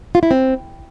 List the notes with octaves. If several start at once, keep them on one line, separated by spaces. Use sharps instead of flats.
F4
E4
C4